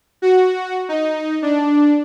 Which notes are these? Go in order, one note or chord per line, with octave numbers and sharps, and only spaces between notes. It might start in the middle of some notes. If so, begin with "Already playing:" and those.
F#4
D#4
D4